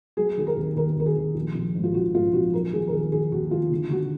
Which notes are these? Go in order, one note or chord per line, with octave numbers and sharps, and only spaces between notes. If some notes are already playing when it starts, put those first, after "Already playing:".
F#3 G#4
D#3 G#4
A#4
D#2
D#2 A#4
D#2 A#4
G#4
D#2
A#1
A#1
G#2
F4
A#1 F#4
G#2 F4
A#1 F#4
F#3 A#4
D#3 G#4
A#4
D#2 G#4
D#3 G#4
D#2 F#4
D#3 F4
D3
D3 F#4